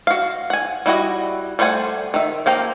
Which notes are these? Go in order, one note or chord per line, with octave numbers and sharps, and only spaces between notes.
F#4 F5
F#5 G#5
G3 E4 F#4 D#5
G3 A3 C5 F#5 G#5
D#3 E5
F3 A#3 G5 A#5